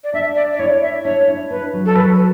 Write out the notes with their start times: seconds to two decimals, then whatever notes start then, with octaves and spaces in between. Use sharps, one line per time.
0.04 D5
0.14 D4 E5
0.35 D5
0.53 D5
0.59 E4 C#5
0.82 E5
1.04 D4 C#5
1.28 E4
1.50 D4 B4
1.73 F#3
1.86 A4
1.96 F#3 B4